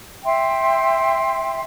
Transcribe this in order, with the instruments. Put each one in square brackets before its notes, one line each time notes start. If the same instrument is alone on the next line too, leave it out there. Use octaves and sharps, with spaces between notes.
[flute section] E5 G5 C6